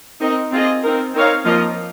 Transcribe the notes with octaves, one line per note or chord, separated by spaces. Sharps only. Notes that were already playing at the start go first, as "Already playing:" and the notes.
C4 D#4 A#4 D#5
C4 F4 G#4 D#5
C4 D#4 A#4
C4 D#4 A#4 C#5 F5
F3 A#3 F4 A#4 D#5